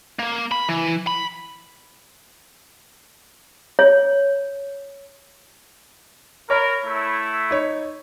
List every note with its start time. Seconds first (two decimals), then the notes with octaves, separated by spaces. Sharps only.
0.19 A#3
0.52 B5
0.69 E3
1.07 B5
3.79 C#5
6.50 A#4 C#5 B5
6.85 A3 E4
7.51 D#4 C#5